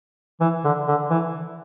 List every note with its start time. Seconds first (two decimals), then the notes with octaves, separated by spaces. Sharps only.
0.41 E3
0.64 D3
0.88 D3
1.10 E3